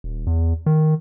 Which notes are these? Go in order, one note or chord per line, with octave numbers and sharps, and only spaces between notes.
D#1
E2
D#3